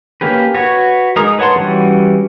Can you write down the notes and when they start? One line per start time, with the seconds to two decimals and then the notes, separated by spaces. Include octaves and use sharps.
0.21 A#3 C#4 G4 B4
0.54 F#4 B4 C#5
1.16 G#3 D#4 A#4 A#5 D#6
1.39 B4 C#5 F#5 A5 C6
1.56 E3 G3 C#4 F#4